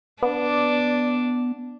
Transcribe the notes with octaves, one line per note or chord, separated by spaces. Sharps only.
B3 D4 D5